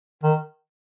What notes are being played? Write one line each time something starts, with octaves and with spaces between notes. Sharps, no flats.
D#3